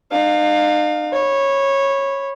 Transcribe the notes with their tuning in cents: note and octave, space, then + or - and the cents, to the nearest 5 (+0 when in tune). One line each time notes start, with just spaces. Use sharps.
D#4 -40 F5 +20
C#5 -15 B5 +0